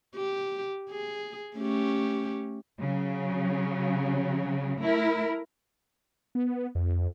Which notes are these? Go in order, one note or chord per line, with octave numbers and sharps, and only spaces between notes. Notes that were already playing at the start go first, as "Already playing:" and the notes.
G4
G#4
A3 C#4 G4
C#3 F#3
A3 E4 A#4
B3
F2